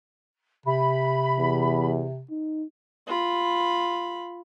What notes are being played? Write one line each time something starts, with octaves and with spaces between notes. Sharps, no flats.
C3 B5
E2
D#4
F4 B5